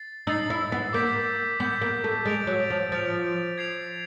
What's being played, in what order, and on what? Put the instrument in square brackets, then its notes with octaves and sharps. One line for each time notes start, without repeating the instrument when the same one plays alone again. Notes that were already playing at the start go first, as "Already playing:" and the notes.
Already playing: [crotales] A6 C7
[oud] D#4 [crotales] E6 A6 C7
[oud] E4
B3
[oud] A#3 [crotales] D6 G6 B6
[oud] B3 [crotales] D6 G6 B6
[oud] A#3
A3
[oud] G#3 [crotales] A6 D7 F7
[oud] F#3
F3
[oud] F3 [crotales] A6 D7 F7
[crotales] G#6 C7 F7